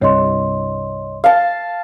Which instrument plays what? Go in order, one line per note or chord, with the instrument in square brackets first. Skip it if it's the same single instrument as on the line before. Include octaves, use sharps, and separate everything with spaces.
[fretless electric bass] C2 G2 [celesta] C#5 D#5 C6
[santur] F5 A5